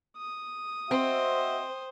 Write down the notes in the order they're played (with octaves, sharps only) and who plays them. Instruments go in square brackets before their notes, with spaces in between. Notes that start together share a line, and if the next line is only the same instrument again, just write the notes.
[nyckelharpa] D#6
[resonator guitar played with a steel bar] C4 [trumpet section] F#4 D#5 E5 [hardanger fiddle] C5